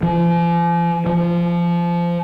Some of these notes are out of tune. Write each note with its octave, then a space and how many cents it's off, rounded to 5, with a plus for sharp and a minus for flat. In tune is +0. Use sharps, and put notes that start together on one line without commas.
F3 -40
F3 -20